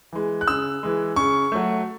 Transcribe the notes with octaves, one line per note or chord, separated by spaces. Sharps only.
E3 G#3
F#6
C#3 E6
E3 G#3
C#3 C#6
F#3 A3